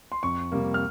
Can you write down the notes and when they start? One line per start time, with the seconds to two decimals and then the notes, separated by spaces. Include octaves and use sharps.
0.12 C6
0.23 F2 C#6
0.52 C3 G3 A#3
0.74 F6